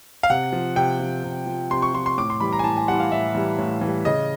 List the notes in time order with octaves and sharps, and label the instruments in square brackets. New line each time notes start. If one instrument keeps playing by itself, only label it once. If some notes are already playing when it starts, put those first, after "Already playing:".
[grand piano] F5
C3 F#5
F3
C3 G5
F3
C3
F3
C3 C6
C#6
F3 C6
C6
A2 D6
C6
E3 G3 B5
A#5
G#5
A2 A5
G#5
G3 F#5
E3
F5
A2 E5
E3 G3
A2
E3
G3
C#3 D#5